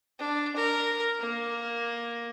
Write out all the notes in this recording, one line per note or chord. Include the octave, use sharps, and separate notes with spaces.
D4
A#4
A#3